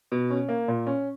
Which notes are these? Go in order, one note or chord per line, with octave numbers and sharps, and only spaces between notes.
B2
C#4
A#3
A#2
C#4